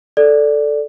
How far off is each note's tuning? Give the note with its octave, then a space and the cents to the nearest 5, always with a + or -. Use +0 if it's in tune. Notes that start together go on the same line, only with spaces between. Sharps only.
A4 +0 D5 +0